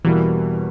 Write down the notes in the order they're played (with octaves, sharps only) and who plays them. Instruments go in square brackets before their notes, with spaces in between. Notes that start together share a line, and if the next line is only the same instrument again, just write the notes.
[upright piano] E2 B2 G3 A#3 [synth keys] E3